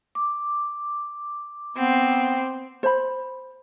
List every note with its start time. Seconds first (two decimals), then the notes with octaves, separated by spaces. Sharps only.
0.15 D6
1.77 B3 C4
2.83 C5 B5